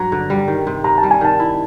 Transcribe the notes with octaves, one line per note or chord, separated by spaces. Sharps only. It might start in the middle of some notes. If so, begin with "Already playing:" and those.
Already playing: G2 F#3 A#5
D3
G3
D#3
C3
C3 A#5
A5
G3
G#5
D#3 A5
E4